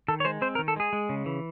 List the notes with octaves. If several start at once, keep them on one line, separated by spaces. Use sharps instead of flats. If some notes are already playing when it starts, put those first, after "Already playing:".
D#3 A4
C#5
G#3 C5
C4 C5
A#4
D#3
A4
G#3 G#4
G#3
C#3
E3